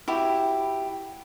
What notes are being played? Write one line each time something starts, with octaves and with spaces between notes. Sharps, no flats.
E4 F#4 G4 B5